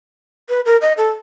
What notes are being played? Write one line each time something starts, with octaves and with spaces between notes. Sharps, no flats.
B4
A#4
D#5
A4